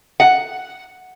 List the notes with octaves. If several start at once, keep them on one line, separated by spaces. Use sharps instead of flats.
F#5